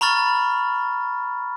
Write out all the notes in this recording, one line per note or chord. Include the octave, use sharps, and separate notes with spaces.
A#5 B5 C#6 F6 A6